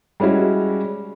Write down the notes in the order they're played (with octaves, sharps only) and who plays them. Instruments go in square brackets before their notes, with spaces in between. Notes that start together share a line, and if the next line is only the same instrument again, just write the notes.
[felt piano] G3 G#3 C#4 E4 F#4